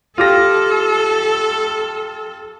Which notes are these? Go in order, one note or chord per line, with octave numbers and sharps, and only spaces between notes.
F4 G4 A4 A#6